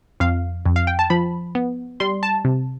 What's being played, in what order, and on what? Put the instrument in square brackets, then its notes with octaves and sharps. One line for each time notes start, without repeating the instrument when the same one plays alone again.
[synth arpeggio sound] F2 F5
F2
F5
G5
A5
F3 B5
B3
G3 C6
A5
C3